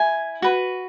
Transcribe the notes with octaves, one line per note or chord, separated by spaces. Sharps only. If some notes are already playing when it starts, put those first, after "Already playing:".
Already playing: E4 G#5
F#4 B4